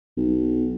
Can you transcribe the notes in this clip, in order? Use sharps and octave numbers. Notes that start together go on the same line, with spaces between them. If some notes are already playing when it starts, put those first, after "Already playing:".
B1